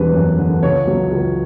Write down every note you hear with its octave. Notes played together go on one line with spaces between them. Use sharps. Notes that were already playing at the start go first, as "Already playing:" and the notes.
Already playing: E1 E2 G3 D4 B4
F#2
D3
C#2 C#5
F#3
C#2